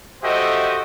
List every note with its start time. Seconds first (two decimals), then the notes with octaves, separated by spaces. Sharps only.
0.23 F#4 G4 A4 C5 D#5 E5